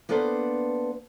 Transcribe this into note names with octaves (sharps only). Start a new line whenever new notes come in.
A#3 B3 D4 A4 B4 C5